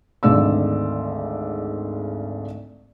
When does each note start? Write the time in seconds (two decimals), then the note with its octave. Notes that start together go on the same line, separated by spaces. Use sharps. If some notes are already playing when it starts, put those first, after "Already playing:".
0.23 G#1 D2 G#2 D5 E6